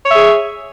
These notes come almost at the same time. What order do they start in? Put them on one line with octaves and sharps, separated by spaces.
C#5 E5 G#4